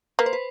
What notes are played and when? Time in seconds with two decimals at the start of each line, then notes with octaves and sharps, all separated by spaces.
0.19 A#3 B4
0.26 C5
0.33 B4